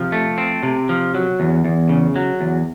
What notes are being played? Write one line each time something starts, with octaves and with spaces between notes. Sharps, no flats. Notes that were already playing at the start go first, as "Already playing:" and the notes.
Already playing: C3 F3
A3
C4
C3
F3
F#3
E2
E2
C#3
F#3
E2